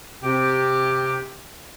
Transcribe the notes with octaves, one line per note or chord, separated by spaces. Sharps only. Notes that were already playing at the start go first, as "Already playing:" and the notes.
C3 G4